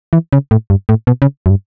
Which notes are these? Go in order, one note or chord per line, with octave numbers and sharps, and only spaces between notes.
E3
C#3
A2
G2
A2
B2
C#3
F#2
G2